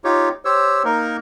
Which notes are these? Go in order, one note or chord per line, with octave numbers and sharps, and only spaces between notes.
D#4 F4 G4 C#5
G4 C5 C#5 E6
A#3 D#4 A#4